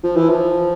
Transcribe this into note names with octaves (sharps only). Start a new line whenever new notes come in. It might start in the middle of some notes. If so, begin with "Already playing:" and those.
F3
E3
F3